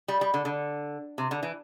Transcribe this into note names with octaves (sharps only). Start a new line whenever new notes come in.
G3
G3
D3
D3
C3
D3
E3